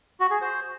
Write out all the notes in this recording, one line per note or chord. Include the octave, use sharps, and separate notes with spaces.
F#4
G#4
C5